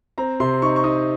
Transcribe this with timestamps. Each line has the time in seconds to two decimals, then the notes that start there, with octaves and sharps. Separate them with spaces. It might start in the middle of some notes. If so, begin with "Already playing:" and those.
0.18 C4 A#5
0.40 C3 C6
0.62 D#4 C#6
0.76 C#6
0.84 D#4 D#6